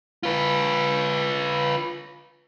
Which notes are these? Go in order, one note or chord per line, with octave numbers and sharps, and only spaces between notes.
F4 B4